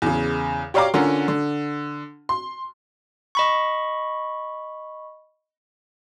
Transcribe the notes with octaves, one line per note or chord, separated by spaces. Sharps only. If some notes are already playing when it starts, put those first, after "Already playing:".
E2 C#3
G4 C#5 D5 F5 A#5 D6
D3 C#4 F4 A#4 F#5
D3
C6
D#5 B5 C#6